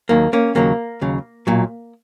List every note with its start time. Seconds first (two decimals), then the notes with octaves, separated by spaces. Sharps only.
0.09 D#2 D#3 F#3 A#3
0.33 A#3 C#4
0.55 D#2 C#3 F#3 A#3
1.01 D#2 C#3 F#3
1.47 B1 A#2 F#3